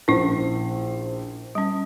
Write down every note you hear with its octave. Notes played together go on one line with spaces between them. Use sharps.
A#1 C#4 E4 C5
G3 C#4